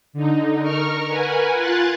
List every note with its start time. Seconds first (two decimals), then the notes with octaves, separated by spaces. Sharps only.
0.13 D3 D#4
0.62 A#4 C#6 F6
1.08 A#4 B4 F#5 G#5
1.54 F4 F#6 G#6 A6